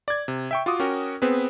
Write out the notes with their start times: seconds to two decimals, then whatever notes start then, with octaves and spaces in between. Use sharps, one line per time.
0.08 D5 G#6
0.28 C3
0.51 E5 G5 C#6
0.66 F4 F#4 D6 D#6
0.80 C#4 F#4 A#4 G5
1.22 B3 C4 G#4 B4